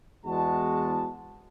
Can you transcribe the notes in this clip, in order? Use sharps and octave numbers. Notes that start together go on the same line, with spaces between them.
E2 G#3 F#4 A5